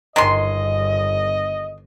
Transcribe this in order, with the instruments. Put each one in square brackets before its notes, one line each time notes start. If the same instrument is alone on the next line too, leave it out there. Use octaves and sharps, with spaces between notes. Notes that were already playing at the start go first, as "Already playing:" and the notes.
[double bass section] G1 [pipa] D#3 G#3 C6 [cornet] D#5